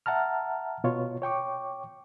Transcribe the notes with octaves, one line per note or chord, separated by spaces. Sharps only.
E5 F#5 A5 A#5 F6
B2 F4 C#5
C#5 G5 C#6 D6